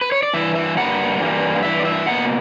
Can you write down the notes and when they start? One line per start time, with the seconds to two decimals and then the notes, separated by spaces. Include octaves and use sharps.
0.01 B4
0.12 C#5
0.23 D5
0.33 G2 E3 E5
0.55 E5
0.77 G2 E3 G3 A#3 F#5
1.20 G2 E3 G3 A#3
1.63 G2 E3 E5
1.80 D5
1.85 E5
2.06 B2 A#3 F#5